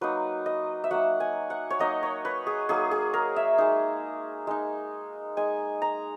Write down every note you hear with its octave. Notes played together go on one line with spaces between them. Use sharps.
F#3 A#3 D#4 B4
D#5
E5
F#3 A#3 D#4 F#5
G#5
F#5
C#5
F#3 A#3 D#4 D#5
C#5
B4
G#4
F#3 A#3 D#4 G#4
G#4
A#4
E5
G#3 D#4
G#3 D#4
G#3 D#4 G#5
A#5